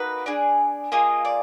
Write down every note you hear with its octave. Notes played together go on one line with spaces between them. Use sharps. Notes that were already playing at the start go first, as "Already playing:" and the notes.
Already playing: A#3 D#4 F#4 B4
D4 G#4 D5
A#3 F4 G#4 D#5
D5